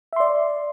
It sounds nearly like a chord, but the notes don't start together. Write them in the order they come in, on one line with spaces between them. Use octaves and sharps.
E5 C6 D5